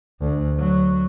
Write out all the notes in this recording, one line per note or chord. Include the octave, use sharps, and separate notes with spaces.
D2
F#3